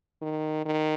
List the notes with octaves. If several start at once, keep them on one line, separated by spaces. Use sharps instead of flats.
D#3
D#3